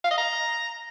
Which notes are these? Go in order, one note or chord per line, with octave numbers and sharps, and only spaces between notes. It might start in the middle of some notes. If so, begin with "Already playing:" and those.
F5
D#5
A#5